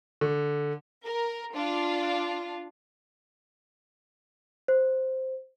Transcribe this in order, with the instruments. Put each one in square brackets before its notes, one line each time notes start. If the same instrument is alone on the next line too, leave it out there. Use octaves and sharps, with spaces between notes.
[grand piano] D3
[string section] A#4
D4 F4
[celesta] C5